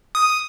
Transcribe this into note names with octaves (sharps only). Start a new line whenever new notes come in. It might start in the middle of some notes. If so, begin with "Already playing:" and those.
D#6